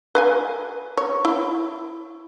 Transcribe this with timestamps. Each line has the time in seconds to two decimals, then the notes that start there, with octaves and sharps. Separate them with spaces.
0.15 B4 F5 G#5
0.97 C#5
1.25 E4